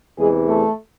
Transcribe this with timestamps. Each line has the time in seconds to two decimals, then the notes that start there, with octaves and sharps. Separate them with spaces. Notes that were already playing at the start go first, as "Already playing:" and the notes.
0.18 E2 C3 E3 G#3 G#4
0.47 A3 A4